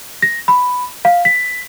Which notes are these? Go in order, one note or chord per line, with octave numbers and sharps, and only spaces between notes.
A#6
B5
F5
B6